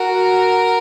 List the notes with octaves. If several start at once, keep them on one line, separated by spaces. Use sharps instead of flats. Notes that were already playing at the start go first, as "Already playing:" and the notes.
Already playing: F#4 A#4